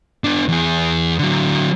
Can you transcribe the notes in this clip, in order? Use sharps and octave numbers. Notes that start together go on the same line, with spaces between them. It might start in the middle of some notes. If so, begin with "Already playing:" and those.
B3 D4
E2 G#4
D3 F#3